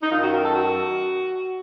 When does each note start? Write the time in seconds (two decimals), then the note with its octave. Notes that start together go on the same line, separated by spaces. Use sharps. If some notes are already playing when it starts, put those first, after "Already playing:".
0.02 D#4
0.11 F#2 D#3 F4
0.22 F#4
0.33 A#4
0.44 A4
0.55 F#4